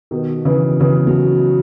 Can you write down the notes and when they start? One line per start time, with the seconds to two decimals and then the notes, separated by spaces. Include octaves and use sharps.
0.11 B2 D#3
0.45 C#3 E3
0.80 C#3 E3
1.07 F#3